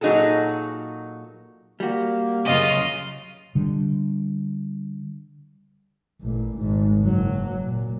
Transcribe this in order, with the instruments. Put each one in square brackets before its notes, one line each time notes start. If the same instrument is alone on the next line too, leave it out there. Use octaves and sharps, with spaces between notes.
[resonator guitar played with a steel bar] A#2 F#3 D#4 F#4 G#4 A4
[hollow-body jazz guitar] G3 F#4 [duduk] A#3
[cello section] F#2 C#3 [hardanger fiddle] F4 D#5
[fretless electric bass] D3 G3
[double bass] A1 A#2
G#1 G#2
F#1 F#3
A#2